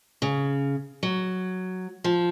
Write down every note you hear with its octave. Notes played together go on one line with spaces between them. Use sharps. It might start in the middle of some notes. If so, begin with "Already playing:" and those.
C#3
F#3
F3